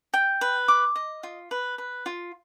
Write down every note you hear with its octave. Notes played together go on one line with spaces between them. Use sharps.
G5
B4
D6
D#5
F4
B4
B4
F4